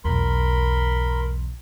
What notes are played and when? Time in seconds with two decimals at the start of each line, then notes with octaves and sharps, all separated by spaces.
0.04 B1 E2 A#4 B5 C6